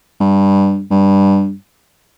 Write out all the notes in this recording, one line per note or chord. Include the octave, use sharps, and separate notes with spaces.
G2
G2